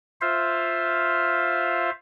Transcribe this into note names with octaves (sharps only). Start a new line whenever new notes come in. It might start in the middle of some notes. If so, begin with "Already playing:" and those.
F4 C5 E5 F5